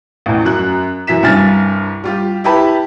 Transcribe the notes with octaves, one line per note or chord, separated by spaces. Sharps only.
A1 E2
F#2 F#6
F#2 E3 E5 B6 E7
C2 G2 G#5 F6 A6
G3 F4 G4
E4 G4 B4 A5 B5